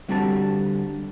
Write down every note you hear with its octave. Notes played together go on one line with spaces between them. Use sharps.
D3 G3 C4 F#4 G4 A5